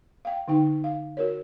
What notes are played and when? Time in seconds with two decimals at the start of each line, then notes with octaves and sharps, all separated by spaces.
0.25 F5 G5
0.48 D3 D#4 G5
0.84 F5
1.17 F#4 A#4 C#5